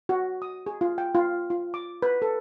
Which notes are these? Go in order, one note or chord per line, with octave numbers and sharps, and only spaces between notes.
F#4
D#6
G#4
F4
G5
F4
F4
D6
B4
A4